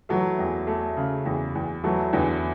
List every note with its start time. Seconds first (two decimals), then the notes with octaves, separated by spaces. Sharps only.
0.09 E3 F#3 A3
0.39 E2
0.67 A3
0.97 C#3
1.26 E2
1.55 E2
1.83 E3 F#3 A3
2.13 E2 D3 E3